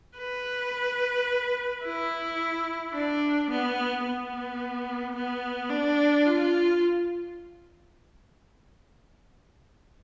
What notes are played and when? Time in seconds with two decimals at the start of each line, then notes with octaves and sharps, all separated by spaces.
0.18 B4
1.84 E4
2.94 D4
3.50 B3
4.05 B3
5.15 B3
5.70 D4
6.26 F4